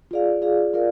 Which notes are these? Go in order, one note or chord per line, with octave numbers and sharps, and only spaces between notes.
F4 G#4 D5 F5
F4 G#4 D5 F5
F4 A#4 D5 F5